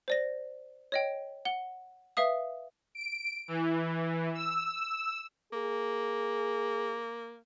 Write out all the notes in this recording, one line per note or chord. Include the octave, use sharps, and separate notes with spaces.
C5 D5 A#6
C#5 D#5 G5
F#5 G7
B4 E5 F5 D#6
D7
E3
E6
A#3 G#4